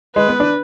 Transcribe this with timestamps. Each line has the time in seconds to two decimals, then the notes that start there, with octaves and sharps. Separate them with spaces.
0.16 G#3 B4
0.28 B3
0.40 D4